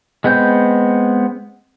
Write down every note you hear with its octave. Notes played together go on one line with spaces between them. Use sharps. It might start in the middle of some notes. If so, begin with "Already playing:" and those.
G#3 B3 C4 G6